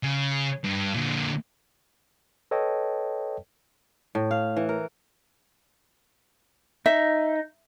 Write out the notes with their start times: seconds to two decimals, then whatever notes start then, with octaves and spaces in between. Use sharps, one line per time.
0.03 C#3
0.64 G2
0.94 A#2 D3
2.51 A4 B4 C#5 D#5 G5 A5
4.15 A2
4.31 F5
4.57 E3
4.69 A#4
6.86 D#4 E5